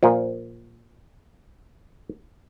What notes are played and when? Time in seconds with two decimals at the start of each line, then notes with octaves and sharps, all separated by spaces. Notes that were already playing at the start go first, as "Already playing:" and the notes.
0.03 A#2 F3